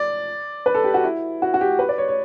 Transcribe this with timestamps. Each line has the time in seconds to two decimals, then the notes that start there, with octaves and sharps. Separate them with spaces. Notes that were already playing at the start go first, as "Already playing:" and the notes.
Already playing: D5
0.66 B4
0.74 A4
0.84 G4
0.94 F#4
1.04 E4
1.42 F#4
1.54 F#4
1.61 G4
1.79 B4
1.89 D5
1.98 C#5
2.08 C#5